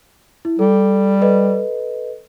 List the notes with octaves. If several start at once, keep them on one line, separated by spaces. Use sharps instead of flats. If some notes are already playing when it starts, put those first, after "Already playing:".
E4
G3 A4
A4 B4 D#5